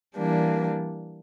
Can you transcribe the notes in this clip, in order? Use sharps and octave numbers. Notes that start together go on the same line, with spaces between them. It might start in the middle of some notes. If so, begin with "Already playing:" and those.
E3 G3 A#3 D4